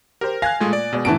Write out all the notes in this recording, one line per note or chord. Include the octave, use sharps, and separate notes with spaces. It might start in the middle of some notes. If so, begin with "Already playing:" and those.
G4 A#4 C5
F5 G#5 F#6 G#6 A#6
A#2 G#3 A3 F4 D#6 G#6
D5
B2 G#3 D5
F#2 A2 D3 E3 A5 D7